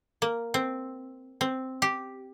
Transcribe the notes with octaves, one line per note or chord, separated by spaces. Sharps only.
A#3
C4
C4
G4